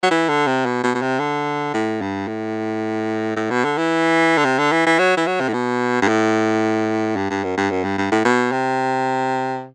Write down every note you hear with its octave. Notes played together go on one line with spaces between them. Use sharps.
F#3
E3
D3
C3
B2
B2
B2
C3
D3
A2
G2
A2
A2
B2
D3
E3
D3
C3
D3
E3
E3
F#3
E3
F#3
C3
A2
B2
G2
A2
G2
G2
F#2
G2
F#2
G2
G2
A2
B2
C3